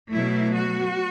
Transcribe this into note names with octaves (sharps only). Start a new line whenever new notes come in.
B2 F#3 A3 E4
F#4